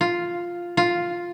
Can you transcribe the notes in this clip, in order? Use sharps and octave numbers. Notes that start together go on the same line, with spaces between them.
F4
F4